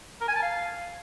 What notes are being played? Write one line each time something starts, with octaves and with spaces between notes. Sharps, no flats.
A#4
G#5
A5
F5